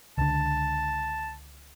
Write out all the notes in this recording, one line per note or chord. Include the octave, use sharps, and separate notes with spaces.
C#2 D3 A5